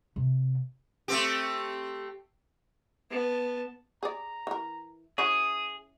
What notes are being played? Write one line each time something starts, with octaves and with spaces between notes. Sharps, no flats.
C3
A3 C4 G4
B3 A5
G#4 D5 A#5
E3 A#4
C#4 E4 F#4 G#4 D#6